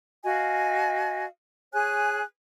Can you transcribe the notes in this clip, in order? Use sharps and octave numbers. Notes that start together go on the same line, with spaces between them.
F#4 D#5 F5 G#5
G#4 C#5 G#5 F#6